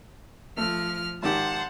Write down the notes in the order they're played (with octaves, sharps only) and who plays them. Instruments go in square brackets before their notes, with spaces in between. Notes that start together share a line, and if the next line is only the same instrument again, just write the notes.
[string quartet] F3 F6 [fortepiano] A3
[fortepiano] G#1 D#3 G4 [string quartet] C5 F#5 A5